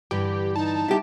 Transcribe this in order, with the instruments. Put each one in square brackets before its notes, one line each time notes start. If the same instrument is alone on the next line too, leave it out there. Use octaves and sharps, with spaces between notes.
[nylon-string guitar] G2 D3 E3 [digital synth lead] G4
[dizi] D#4 [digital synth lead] A5
[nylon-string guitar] G3 [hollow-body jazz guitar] E4 G4